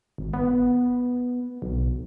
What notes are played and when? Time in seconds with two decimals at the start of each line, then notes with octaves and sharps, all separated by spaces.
0.18 G#1
0.34 B3
1.62 B1